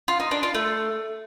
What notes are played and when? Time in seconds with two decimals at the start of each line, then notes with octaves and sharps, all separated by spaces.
0.08 F4
0.20 D#4
0.31 D4
0.43 F4
0.55 A3